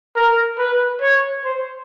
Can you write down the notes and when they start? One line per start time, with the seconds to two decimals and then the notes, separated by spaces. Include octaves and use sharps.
0.15 A#4
0.58 B4
1.01 C#5
1.45 C5